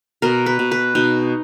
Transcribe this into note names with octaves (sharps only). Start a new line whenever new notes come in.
B2 A#4
B4
B2
B4
B2 D#4